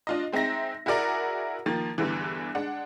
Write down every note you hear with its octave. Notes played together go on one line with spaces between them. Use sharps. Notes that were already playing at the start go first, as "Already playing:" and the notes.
D4 F4 D#5
G#3 C4 D#4 E5 A#6
E4 F#4 G#4 A#4 D5
D#3 F3 A#3 A6
E2 G2 D3 E3
G#3 D4 F#5